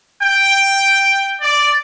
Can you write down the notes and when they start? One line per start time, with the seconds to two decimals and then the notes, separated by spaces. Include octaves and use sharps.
0.21 G5
1.42 D5